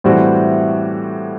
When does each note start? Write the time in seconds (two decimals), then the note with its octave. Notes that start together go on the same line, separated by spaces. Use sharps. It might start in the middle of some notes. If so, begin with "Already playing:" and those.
0.04 A2 E3 G3 C4 F#4